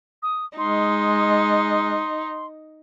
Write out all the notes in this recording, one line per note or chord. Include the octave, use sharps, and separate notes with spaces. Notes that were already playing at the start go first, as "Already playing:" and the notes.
D#6
G#3 D#4 C6